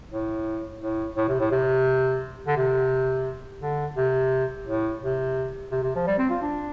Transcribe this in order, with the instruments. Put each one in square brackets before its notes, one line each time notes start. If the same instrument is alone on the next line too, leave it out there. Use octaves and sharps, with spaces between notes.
[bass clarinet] A2
A2
A2
C3
A2
C3
D3
C3
D3
C3
A2
C3
C3
C3
F3
G3
C4
F4
D4